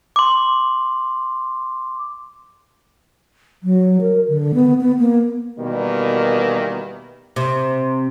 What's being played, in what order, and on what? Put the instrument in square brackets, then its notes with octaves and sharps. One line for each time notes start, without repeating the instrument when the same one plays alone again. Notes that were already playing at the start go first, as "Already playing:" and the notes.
[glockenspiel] C6 D6
[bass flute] F#3
A#4
D3
B3
B3
A#3
[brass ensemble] B2 D#3 E3 G3 A#3 B3
[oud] C3